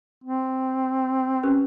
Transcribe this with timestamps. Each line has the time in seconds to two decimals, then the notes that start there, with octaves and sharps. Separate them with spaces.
0.24 C4
1.43 C#4 G4 B4